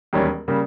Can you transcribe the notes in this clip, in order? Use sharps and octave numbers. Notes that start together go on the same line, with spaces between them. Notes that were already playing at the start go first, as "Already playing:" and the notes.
E1 D#2 D#3 G3 C#4
C#3 G3 A#3